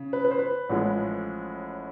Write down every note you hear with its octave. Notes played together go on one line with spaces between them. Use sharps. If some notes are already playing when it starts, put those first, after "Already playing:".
Already playing: C#3
B4
B4
C5
B4
A1 A2 F3 G#3